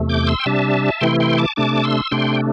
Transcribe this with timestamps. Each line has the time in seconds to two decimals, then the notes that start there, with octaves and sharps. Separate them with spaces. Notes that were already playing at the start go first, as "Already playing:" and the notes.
Already playing: E2 C3 A3
0.09 D6 G6
0.27 C6 E6
0.40 G5
0.46 C3 G3 D4 E5 A5
1.01 C3 E3 A3 E4 G5 C6
1.20 G5 C6
1.38 A5 D6
1.56 C3 A3 D4 A5 D6
1.84 C6 E6
2.11 C3 A3 D4 G5 C6